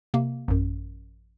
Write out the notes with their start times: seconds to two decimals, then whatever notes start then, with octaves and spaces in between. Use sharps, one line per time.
0.14 C3 A#3
0.48 A1 F#2